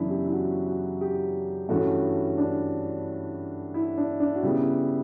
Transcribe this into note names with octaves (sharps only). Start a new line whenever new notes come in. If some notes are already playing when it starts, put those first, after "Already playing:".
Already playing: F#2 C#3 E3 B3 D4 E4
G4
E4
F#4
F#4
G4
G2 E3 A3 C#4 F#4
D4
E4
D4
D4
F#4
C#3 G3 B3 E4